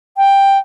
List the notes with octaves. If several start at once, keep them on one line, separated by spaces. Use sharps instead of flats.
G5